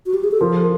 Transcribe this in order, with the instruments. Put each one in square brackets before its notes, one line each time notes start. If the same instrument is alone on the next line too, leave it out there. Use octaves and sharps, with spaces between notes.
[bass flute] F#4
G4
G#4
A4
[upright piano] F3 [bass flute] A#4